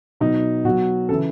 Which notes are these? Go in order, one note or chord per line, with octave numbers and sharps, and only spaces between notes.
B2 F#3 D#4
B2 F#3 F#4
C#3 E3 A4